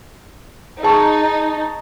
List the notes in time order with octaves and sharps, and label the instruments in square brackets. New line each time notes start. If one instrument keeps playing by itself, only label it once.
[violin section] D#4 [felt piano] G#4 A5 C#6